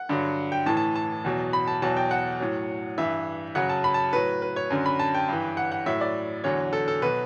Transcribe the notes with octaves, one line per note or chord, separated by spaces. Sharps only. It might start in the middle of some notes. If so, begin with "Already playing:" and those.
Already playing: F#5
G2 D3 F#3
G5
A2 E3 A5
A5
A5
E2 B2 F#3
B5
A5
E2 B2 F#3 A5
G5
F#5
A2 F#3
G2 E3 E5
F#2 C#3 F#3 F#5
A5
B5
A5
A2 F#3 B4
B4
C#5
F#2 D3 F#3
B5
A5
G5
G2 E3
F#5
F#5
A2 F#3 E5
D5
E2 D3 F#3 C#5
A4
A4
B2 F#3 B4